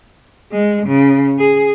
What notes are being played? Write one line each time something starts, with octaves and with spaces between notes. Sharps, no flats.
G#3
C#3
G#4